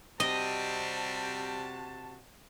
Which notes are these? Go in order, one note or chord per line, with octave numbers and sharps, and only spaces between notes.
C3 G3 C4 F#4 D#5 A5